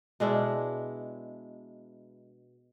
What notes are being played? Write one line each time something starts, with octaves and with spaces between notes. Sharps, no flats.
B2 G#3 D4 E4